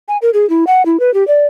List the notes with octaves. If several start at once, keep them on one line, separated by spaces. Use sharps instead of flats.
G#5
A#4
G#4
E4
F#5
E4
B4
G4
D5